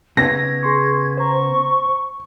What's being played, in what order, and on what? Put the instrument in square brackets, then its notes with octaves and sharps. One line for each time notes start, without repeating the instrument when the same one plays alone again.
[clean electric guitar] C#3 B3 [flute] G#6 [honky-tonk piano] A#6
[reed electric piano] G#4 C6 C#6
[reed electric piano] C5 A#5 [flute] C#6